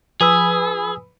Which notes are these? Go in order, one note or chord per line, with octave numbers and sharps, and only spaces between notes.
F3 G#4 B4 G#5 B5 D#6 E6